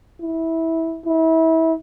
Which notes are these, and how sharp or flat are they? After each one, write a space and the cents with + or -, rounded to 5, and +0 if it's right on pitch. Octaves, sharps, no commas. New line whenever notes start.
E4 -15
E4 -30